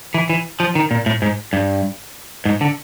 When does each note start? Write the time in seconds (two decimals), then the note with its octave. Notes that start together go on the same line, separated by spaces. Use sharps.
0.14 E3
0.29 E3
0.60 F3
0.75 D#3
0.91 A#2
1.06 A2
1.22 G#2
1.53 G2
2.45 G#2
2.61 D3